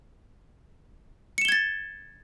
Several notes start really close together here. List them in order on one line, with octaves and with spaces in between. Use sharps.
C#7 E7 G7 G#6 A6